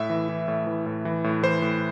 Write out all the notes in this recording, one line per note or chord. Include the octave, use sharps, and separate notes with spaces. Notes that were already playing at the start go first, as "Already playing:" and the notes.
Already playing: A2 E5
E3
E3
A2
E3
A2
E3
A2
E3 C5
A2